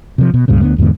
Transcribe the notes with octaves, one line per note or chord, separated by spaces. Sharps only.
C3 F3
B2
C#2 G2 A#2 C#3
D2 B3 D4
E2 G#2 D3 B3